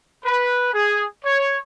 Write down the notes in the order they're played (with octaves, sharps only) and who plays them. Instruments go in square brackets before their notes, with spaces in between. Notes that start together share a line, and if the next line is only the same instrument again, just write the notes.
[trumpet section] B4
G#4
C#5